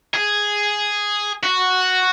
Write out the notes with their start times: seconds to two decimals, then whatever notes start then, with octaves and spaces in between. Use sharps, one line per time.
0.14 G#4
1.43 F#4